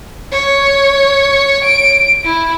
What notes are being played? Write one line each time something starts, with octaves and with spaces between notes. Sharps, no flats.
C#5
D7
E4